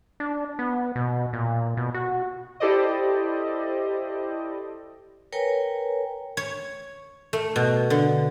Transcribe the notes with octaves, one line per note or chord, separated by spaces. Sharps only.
D4
B3
B2
A#2
B2
F#4
E4 G4 A4 C5 D5 D#5
A#4 B4 C#5 G5 G#5 A#5
C#5
A3
B2
D3